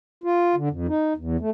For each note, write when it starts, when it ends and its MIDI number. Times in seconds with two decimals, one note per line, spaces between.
0.24 0.55 65
0.56 0.69 50
0.70 0.87 41
0.88 1.13 63
1.17 1.37 40
1.40 1.50 57